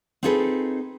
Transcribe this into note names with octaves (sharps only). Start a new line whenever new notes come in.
C4 D#4 F4 G#4 A4 B4